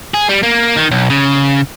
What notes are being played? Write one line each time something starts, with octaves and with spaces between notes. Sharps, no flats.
G#4
G3
A#3
D#3
B1
C#3